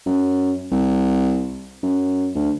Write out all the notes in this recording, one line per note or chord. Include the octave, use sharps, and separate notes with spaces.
F#2
C2
F#2
D2